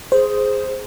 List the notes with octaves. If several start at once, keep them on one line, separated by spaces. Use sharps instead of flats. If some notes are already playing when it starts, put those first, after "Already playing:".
G#4 C5